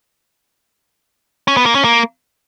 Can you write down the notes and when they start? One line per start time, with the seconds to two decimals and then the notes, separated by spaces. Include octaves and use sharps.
1.48 C#4
1.57 B3
1.66 A#3
1.75 C#4
1.84 A#3